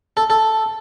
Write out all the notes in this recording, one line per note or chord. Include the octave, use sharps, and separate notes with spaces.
A4
A4